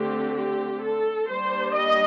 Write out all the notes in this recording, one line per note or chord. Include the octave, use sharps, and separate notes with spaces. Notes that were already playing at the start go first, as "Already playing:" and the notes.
Already playing: D3 A3 C4 G4
G4
A4
G3 A#3 D4 C5
D#5